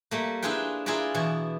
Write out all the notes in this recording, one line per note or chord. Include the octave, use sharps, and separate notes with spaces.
G3 A3 A#3
D4 E4 F4 G#4 B4 G5
E4 F4 G#4 A#4 B4 D5
B2 E3 E4